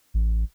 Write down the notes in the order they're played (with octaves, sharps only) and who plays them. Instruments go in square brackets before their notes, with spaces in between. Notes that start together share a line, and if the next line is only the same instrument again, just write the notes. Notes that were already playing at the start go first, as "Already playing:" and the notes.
[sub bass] A1